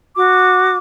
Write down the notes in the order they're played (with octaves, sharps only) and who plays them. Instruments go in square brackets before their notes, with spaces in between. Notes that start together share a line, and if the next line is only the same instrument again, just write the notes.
[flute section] F#4 D6